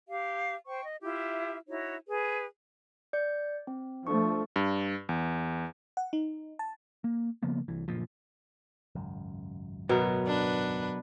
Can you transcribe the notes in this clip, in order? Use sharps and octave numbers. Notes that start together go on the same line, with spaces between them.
G4 F5
C5 G5 C#6
D#5
E4 F4 G4 E5
D#4 E4 F#4 C#5
G#4 B4
D5 G6 C#7
C4
F3 A3 D4 C#6
G2
E2
F#5
D#4
A5
A#3
C#3 F3 A#3 B3
C2 E3
F#1 C#2 A#2 F3
G#1 C#2 F#2
B2 F#3 B3 A#4
D4 B4